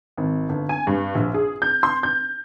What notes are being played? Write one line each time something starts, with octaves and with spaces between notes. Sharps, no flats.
G#1
G1
G#5
G2
A#1
G#4
G6
C6
G6